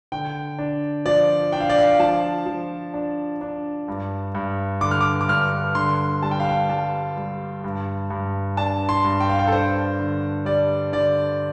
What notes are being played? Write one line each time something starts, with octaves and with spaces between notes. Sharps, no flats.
D3 G5
D4
F3 D5
D4 G5
F5
D5
F5
F3 A5
F3
D4
D4
G2
G2
D3 D6
F6
D6
D6
G2 F6
D3 C6
G3 A5
G5
F5
G5
G3 A5
G3
G2
G2
D4 A5
C6
G2
G5
F5
G5
A4
D4 C5
D3
G3 D5
D3 D5